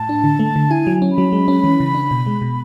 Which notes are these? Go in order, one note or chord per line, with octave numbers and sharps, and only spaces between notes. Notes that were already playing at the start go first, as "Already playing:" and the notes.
Already playing: A2 A5
D4
D3
A3
D3
E4 G#5
F#3
C#4
B5
F#3
G#3
C#4
E3
C#3
D4
B2
G#3
B2